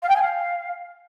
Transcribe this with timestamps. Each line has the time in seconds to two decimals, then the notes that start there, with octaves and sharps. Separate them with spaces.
0.03 F5
0.09 G5
0.15 G#5
0.22 F5